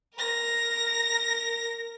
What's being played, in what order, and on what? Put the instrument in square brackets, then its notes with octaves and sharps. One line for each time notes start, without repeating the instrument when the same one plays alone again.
[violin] A#4 A#6